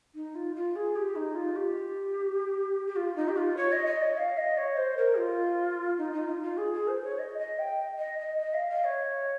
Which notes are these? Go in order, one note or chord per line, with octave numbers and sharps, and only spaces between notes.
D#4
F4
F4
G#4
G4
D#4
F4
G4
G4
F4
D#4
G4
F4
C#5
D#5
D#5
C#5
F5
D#5
C#5
C5
A#4
F4
D#4
D#4
F4
F4
G#4
G#4
C5
C#5
D#5
D#5
G5
D#5
D#5
D#5
F5
F5
C#5